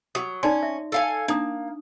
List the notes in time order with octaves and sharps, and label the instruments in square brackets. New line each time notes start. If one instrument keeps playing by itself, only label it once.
[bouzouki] F#3 [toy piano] D#6
[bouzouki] C#4 [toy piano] D#4 D5 C6
[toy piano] E5
[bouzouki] A4 F5 G#5
[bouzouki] A#3 [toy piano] D4 D#4 D#6